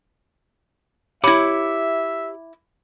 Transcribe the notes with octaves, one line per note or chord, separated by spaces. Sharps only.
E4 G4 C#5 E5 B5 D6